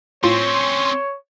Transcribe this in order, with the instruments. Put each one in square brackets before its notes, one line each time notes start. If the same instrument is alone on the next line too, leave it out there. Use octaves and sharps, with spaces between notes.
[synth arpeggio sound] A2 F4 [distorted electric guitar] C4 C#4 [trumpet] C#5 [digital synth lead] C6